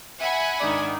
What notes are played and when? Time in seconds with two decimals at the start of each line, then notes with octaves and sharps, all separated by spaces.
0.20 E5 F#5 G#5 B5
0.60 G#2 D#3 D4 D5